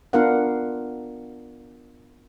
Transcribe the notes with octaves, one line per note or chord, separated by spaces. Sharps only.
B3 D4 F4 A#4 F5 F#5